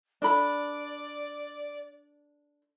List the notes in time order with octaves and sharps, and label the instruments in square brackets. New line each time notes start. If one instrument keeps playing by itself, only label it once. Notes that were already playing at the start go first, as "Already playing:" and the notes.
[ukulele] D4 A4 B5 [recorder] D5